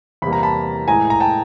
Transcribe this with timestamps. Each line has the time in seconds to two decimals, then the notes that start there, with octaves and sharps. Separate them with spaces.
0.22 E2 C3 E3 G3 A#3 B5
0.33 A#5
0.43 A5 B5
0.88 A2 E3 G#3 G#5 A#5
1.10 A#5
1.20 G5 A5